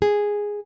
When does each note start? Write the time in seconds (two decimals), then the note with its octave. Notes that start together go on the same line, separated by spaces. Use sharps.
0.02 G#4